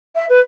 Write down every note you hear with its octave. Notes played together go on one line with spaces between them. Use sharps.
E5
B4